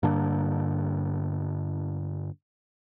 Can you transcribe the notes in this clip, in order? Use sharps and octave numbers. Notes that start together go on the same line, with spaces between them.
G2 D3 A#3 D4